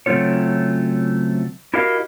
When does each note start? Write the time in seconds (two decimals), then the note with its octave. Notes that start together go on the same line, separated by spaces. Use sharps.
0.06 C#3 F#3 A3 C4 F4 C#5
1.74 E4 F#4 G4 A#4 D#5 F5